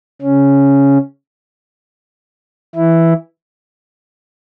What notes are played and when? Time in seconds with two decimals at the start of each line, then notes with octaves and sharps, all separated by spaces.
0.22 C#3 C#4
2.75 E3 E4